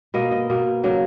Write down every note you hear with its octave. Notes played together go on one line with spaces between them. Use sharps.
B2 A#3 D#5
D#5
B2 A#3
C#3 F#3 A#3